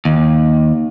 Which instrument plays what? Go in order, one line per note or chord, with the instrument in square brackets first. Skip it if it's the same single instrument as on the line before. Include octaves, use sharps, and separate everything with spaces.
[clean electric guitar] D#2